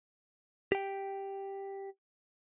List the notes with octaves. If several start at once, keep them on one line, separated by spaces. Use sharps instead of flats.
G4 G5